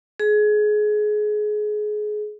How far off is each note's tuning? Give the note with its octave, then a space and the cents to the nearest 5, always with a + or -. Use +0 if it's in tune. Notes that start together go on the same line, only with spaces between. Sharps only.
G#4 +25